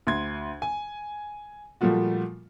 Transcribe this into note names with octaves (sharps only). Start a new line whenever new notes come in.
D2 C6 G#6
G#5
A#2 F3 G3 A3 F4 F#4